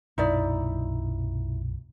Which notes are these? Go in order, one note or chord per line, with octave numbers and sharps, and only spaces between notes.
B1 F#2 A#2 D#4 E4 D5